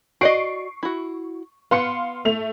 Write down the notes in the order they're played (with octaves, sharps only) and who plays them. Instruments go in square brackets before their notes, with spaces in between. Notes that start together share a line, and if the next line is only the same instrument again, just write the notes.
[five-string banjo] F#4 D5 D#5 [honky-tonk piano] C#6 C7 D7
[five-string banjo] E4 F#4
[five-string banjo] B3 [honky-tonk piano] F5 C6 C#7
[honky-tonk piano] A3 F7